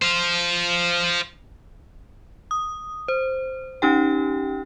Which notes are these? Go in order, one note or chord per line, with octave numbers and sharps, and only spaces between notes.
C5 F5
D#6
C5
C#4 D#4 G4 G5